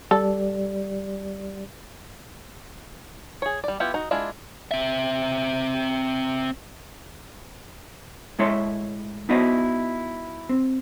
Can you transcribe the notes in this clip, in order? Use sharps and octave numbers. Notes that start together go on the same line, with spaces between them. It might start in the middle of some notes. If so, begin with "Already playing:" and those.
G3 G4 A4 D5
G#4 C#5
G3 D5
B3 E4 F4 G4
D#4 F#4
G#3 D4 E4 F4
C4 E5
A2 G#3 E4 C#5 E5 C6
B3 D#4 E4 F#4 C5 D#5
C4